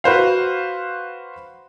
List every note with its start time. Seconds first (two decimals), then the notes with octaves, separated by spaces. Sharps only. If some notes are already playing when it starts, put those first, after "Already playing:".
0.04 F#4 B4 C5 F5